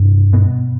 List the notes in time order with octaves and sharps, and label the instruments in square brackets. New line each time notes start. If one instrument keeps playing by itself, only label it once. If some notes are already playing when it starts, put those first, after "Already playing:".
Already playing: [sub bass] G2 [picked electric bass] C3
[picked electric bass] B2 B3